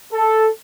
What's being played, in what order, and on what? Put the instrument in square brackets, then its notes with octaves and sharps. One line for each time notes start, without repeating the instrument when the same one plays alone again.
[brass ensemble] A4